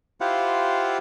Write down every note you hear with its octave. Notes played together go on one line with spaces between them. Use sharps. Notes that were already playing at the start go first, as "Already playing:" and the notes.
E4 F4 G4 C5 F5 F#5